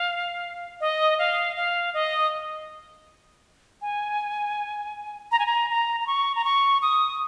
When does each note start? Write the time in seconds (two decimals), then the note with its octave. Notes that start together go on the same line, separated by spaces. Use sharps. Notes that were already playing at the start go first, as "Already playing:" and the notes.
Already playing: F5
0.80 D#5
1.19 F5
1.56 F5
1.94 D#5
3.81 G#5
5.31 A#5
5.39 G#5
5.46 A#5
5.70 A#5
6.00 A#5
6.07 C#6
6.35 A#5
6.44 C#6
6.82 D#6